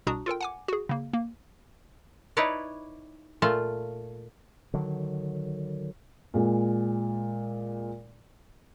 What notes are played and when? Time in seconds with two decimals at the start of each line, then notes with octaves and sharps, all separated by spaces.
0.07 C2 B2 D4 F#4 A#5 D#6
0.26 F4 A4 A#4 G5
0.41 F#5 G#5 D6
0.68 F#4 G#4
0.89 C#3 A#3
1.13 A#3
2.37 D#4 E4 B4 C#5 D5
3.42 A#2 A3 F4
4.74 D3 D#3 F#3
6.34 A#2 G#3